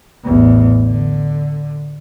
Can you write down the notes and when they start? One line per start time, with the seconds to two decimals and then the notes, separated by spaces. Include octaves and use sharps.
0.24 A1 E2
0.83 D3